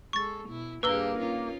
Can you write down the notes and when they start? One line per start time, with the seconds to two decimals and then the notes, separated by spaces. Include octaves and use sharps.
0.13 G#3 A4 C#6 A6
0.49 B2 E4
0.83 G2 A#3 G4 G#4 B4 E6 G7
1.19 C#4 D#4 F4